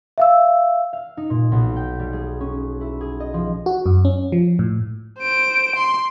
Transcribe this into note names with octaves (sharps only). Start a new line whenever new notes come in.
E5 F5 E6
F5
D#4
A#2
B1
G5
G3
G#4
C#4
E4
G#4
D#5
F3
F#4
F#2
C#4
F3
A2
C5 D7
C6